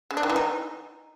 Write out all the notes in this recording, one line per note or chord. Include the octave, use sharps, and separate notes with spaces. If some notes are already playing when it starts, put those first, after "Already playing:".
C#3
D4
D#3
E3
D#4